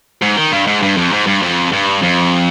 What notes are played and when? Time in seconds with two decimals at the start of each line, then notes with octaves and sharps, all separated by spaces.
0.22 G#2
0.37 D#3
0.52 G2
0.67 G#2
0.82 G2
0.97 F2
1.12 G#2
1.27 G2
1.42 F2
1.72 G2
2.02 F2